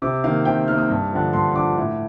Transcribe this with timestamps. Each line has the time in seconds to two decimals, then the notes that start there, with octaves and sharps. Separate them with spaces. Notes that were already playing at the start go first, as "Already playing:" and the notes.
0.02 C3 D6
0.24 D#3 A#3 F5
0.45 C3 G5
0.67 D#3 A#3 F6
0.78 D#6
0.89 G2
1.12 D3 F3
1.33 G2 C6
1.55 D3 F3 D6
1.77 A2